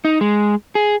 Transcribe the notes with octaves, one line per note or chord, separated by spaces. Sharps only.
D#4
G#3
G#4